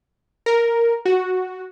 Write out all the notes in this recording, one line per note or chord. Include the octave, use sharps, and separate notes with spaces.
A#4
F#4